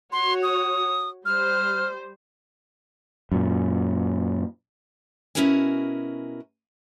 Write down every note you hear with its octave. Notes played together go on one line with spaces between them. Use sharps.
F#4 C#5 C6
D#6
G3 C5 F6
F#2 A#2
B2 C#4 E4 F#4 A#4 G#5